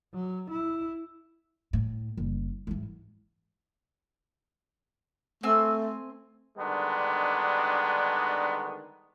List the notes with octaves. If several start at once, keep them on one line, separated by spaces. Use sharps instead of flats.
F#3
E4
A2
F#1 G3
G#2 E3
A3 C4 G#5 E6
D3 D#3 G3 G#3 B3 D4